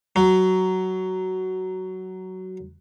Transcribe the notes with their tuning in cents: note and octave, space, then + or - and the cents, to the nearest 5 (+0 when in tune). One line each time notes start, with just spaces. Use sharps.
F#3 +10